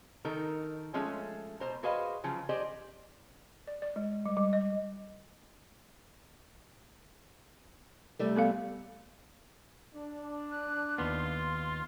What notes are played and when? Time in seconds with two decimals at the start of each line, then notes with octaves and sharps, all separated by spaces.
0.25 D#3 D#4 A4 A#4
0.94 F3 G#3 A3 C#4
1.60 B2 C5 A#5
1.83 F#4 G#4 B4 C5 D#5 F5
2.24 C#3 F3 F#3
2.49 G4 G#4 C5 D5 D#5
3.67 D5
3.82 D5
3.96 G#3
4.26 G3
4.37 G3
4.53 D#5
8.19 C3 G3 A3
8.36 B3 A4 F5
9.94 D4
10.51 F#6
10.98 D#2 B3 F4 C6